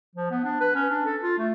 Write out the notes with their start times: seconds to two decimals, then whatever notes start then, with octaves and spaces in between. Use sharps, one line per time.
0.15 F3
0.31 B3
0.44 D4
0.60 B4
0.75 C#4
0.90 D4
1.06 A4
1.22 F4
1.38 A3